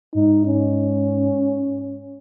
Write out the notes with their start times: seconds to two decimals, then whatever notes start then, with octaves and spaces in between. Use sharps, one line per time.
0.14 G#2 D#4
0.46 C#4